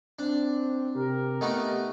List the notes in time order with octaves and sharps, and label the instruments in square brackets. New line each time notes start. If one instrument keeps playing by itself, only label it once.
[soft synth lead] C4 [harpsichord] D4
[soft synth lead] C3 [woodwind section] G4 A#4
[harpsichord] A3 B3 D#4 [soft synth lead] D#5